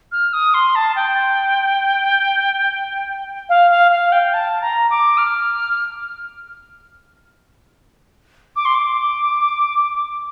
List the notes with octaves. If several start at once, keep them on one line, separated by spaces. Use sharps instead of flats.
F6
D#6
C6
A5
G5
F5
F5
F5
G5
A5
A#5
D6
F6
D6
C6
D6